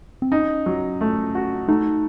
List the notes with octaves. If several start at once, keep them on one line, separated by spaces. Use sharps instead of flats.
C4
C#4 D#4
F#3
A3
F#4
A3 D#4